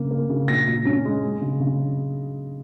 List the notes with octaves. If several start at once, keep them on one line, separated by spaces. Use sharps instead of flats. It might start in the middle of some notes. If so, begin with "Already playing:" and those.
Already playing: C#3 A#3
A#3
C#3
A#2 A#6
A#2
C#4
G#3
G#3
C#3
C#3